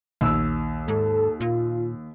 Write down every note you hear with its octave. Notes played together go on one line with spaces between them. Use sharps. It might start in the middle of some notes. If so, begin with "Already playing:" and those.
A#1 D#2 E6
G#2 A4
A#2 F4